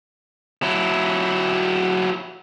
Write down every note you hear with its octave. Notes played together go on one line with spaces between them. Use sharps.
F#3 E4